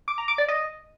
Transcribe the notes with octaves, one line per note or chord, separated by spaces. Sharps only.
D6
A#5
D6
D5
D#5